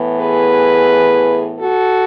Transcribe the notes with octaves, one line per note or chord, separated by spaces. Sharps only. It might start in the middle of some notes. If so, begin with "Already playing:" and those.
Already playing: A2 E3 B3
G#4 B4
F#4 A4